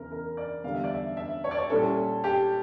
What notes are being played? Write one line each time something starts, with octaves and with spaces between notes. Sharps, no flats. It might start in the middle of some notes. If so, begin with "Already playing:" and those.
Already playing: E2 C#3 E3 A#4
A#4
D5
E2 D3 G3 F5
E5
D5
E5
E5
C#5
D5
C#5
A#2 G3 C#4 E4 A4
G4